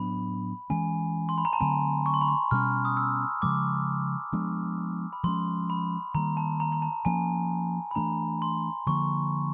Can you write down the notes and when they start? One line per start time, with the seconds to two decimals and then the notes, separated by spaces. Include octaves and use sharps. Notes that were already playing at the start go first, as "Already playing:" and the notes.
Already playing: A2 F#3 B3 D4 B5
0.70 E3 G#3 C#4 G#5
1.29 C6
1.38 B5
1.45 A#5
1.53 A5
1.61 D3 F#3 A3 C4 G#5
2.06 C#6
2.14 C6
2.21 B5
2.28 C6
2.51 B2 G3 A#3 C#4 F6
2.85 D#6
2.97 E6
3.42 C#3 F3 G#3 D6
4.33 F3 G#3 B3 D4
5.13 B5
5.24 F3 G#3 C#4 C6
5.70 B5
6.14 D#3 G3 A#3 A#5
6.37 A5
6.60 A#5
6.72 A#5
6.82 A5
7.05 F3 A#3 C#4 G#5
7.91 B5
7.95 E3 A3 D4 A#5
8.42 C6
8.86 D3 F3 A#3 C#6